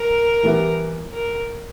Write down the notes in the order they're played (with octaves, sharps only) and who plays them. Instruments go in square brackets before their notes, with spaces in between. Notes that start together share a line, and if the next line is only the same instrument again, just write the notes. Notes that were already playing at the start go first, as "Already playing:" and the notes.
Already playing: [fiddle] A#4
[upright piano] E3 G3 B3 E4 G4
[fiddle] A#4